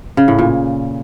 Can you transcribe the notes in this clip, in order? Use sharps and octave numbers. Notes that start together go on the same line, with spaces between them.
C#3
A2
A#2